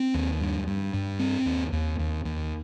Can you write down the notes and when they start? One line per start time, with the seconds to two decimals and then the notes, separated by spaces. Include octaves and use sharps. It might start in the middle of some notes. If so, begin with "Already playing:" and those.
Already playing: C4
0.14 D#2
0.40 G2
0.67 G2
0.93 G2
1.19 C4
1.46 D#2
1.72 D#2
1.99 D#2
2.25 D#2